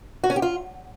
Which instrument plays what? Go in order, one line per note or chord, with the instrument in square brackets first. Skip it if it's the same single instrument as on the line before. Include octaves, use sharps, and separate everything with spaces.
[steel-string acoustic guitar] F#4
C#4
G4
F4